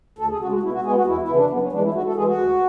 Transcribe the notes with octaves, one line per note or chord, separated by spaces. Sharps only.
D2 A4
G#4
C#3 G#3 F#4
F#4
B2 E4
F#4
G#3 B3 G#4
F#4
E2 E4
E4
C#3 E3 B3
D4
F#2 B3
C#4
E3 G#3 D4
E4
G#2 F#4
A4
E3 G#3 G#4
F#4
D2